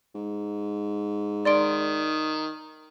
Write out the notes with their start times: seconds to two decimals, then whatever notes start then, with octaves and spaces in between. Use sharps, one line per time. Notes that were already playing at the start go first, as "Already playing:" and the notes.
0.15 G#2
1.45 D#3 D5 C6 D7